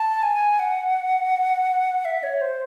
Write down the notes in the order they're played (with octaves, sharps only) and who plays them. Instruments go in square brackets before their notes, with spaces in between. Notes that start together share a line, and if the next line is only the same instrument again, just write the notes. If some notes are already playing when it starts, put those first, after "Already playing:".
Already playing: [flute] A5
G#5
F#5
E5
C#5
C5